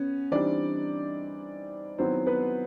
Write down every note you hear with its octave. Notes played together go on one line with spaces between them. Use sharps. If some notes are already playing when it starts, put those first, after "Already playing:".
Already playing: B3 C#4
E3 G3 C4 D4 D#4 D5
D#3 F#3 B3 C4 E4 C5
B3 B4